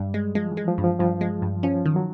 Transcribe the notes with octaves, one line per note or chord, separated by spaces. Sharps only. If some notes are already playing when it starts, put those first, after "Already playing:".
Already playing: G2 G3
G#3
F3 G#3
E3
G#3
F3
G2
F3
G2 F3
G#3
G2
F3 C#4
D#3 F#3
F#3